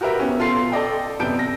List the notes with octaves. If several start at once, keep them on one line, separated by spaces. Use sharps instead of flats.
F#4 G4 A#4 B4 E5
B3 C#4
B2 F4 A4 C6 C7
A4 D5 D#5 G5
F#2 C3 B3 A5 G6 D7
A#6